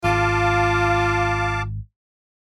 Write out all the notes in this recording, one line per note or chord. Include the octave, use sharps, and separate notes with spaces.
G#1 F4 F5 A5 D6